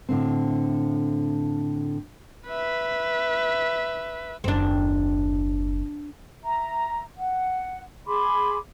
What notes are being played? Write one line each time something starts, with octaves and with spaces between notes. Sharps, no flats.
A2 D3 C4
B4 E5
F#1 D#2 C4 D4
E5 A#5
F#5
G#4 B5 C6 D6